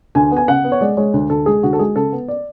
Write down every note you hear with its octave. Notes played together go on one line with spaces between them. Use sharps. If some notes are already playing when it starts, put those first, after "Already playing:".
D2 G#5
B3
G#5
C#3 F#5
B3
C#5
G#3 D5
G#3 C#5
D2
D2 A4
G#3 G#4
D2 F#4
A4
G#3 G#4
C#3 A4
B3
D5